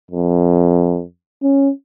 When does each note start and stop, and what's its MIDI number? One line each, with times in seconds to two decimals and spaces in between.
0.11 1.03 41
1.42 1.70 61